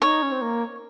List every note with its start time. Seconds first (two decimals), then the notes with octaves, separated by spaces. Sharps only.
0.01 D#4 C#5
0.22 C#4
0.32 C4
0.42 A#3